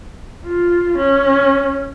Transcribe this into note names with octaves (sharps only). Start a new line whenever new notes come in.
F4
C#4